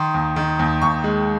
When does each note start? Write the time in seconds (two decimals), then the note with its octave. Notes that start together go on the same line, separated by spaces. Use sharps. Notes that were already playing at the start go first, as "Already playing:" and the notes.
Already playing: D#3 C6
0.14 D#2
0.36 D#3
0.59 D#2
0.81 D#2 C#6
1.04 G#3